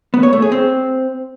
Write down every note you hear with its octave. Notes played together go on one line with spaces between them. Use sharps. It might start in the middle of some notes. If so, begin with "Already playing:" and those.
B3
C#5
A3
G#4
C4